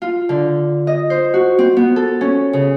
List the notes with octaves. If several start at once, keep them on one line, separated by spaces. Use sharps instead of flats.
F4
D3
D#5
C5
F#4
C4
B3
A4
C#4
C#3